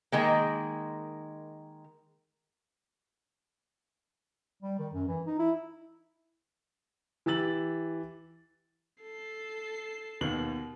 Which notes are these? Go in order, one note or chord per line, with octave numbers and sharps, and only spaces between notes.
D#3 G#3 A#3
G3
D#3
F#2
E3
D#4
E4
E3 G4 E6 A6 F#7
A4 C7
D#2 B2 F#7